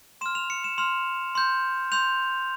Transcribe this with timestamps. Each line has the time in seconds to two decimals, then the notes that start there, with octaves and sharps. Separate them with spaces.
0.21 C6 F6 E7
0.35 F7
0.50 C#7
0.64 E7
0.78 C6 F6 F7
1.35 C6 G6
1.92 C6 G6 F7